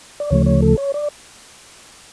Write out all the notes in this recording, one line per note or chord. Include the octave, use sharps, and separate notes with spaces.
D5
D2 C#3 F3 A3 C#5
C#5
A4
C#5
D5